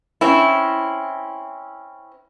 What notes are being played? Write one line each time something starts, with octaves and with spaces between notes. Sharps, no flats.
C4 C#4 E4